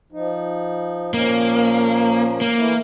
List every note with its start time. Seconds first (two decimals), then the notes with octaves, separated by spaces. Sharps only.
0.12 F3 D#4
1.14 A#2 F3 A#3 C#4
2.41 A#3
2.57 E3 A3 E4